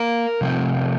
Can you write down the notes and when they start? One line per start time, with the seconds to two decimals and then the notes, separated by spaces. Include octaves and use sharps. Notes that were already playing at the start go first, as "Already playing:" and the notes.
Already playing: A#3 A#4 A#5
0.41 C3 F3 A3 C4